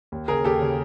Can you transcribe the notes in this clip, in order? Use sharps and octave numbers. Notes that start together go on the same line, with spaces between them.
D#2
C#3 G#4 A#4
D#2 G4 A4
C#3